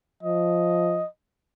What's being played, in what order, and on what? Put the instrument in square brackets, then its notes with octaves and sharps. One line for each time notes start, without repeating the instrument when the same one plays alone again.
[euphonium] F3 [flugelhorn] D#5